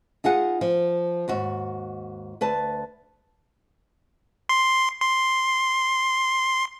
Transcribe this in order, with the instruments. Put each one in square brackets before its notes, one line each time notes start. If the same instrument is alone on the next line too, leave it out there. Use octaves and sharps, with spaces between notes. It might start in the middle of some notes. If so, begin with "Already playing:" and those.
[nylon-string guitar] D#4 F4 G#4 F#5
F3
D#2 G#2 F#4
D2 B4 A5
[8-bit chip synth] C6
C6